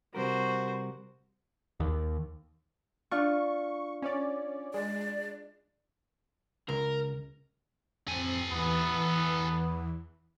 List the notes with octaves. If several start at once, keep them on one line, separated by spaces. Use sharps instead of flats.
C3 G3 F#4 A#4 C5
D#2
D4 F4 F5 C#6
C#4 C#5 D5
G#3 D5
C#2 A#4
F2 C4 A4 G#5
E2 E3 B3